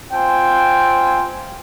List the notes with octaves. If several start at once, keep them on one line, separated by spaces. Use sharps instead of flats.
C4 F4 C5 G5 G#5